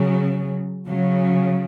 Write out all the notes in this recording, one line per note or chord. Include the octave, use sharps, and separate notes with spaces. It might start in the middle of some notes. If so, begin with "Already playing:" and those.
Already playing: C#3 F#3
C#3 F#3